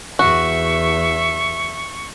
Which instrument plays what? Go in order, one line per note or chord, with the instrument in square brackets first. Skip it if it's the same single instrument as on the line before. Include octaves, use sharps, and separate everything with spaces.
[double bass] E2 [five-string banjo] F#4 [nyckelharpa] E5 [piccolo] C#6